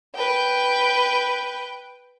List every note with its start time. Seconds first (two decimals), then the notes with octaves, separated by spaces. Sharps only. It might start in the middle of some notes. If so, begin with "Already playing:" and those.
0.16 B4 G5